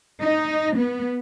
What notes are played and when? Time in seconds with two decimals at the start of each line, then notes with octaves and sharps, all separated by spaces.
0.22 D#4
0.77 B3